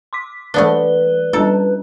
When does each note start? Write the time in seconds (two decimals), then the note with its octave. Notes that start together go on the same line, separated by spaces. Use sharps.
0.13 C6 D6 B6
0.54 E3 A3 B3 D4 B4 D5 G7
1.33 G3 C#4 D4 A4